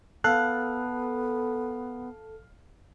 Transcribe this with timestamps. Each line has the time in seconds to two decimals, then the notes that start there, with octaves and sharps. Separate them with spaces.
0.24 B3 A4 F5 F#6